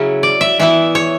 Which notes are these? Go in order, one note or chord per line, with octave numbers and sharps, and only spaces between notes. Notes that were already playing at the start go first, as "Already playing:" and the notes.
Already playing: C#3 F#3 C#4 E4
D5
E5
E3 B3 E4 E5
C#5